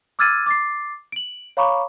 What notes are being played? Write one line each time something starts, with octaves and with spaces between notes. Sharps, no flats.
D6 E6 F6 G#6 A6 D#7
D6 A6 C7
D7 F#7
C#5 F5 A#5 B5 C#6 D6